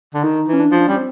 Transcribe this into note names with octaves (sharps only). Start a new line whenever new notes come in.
D3
D#3 D#4
E3
C#4
D4
F3
D4
G3 C#4
C4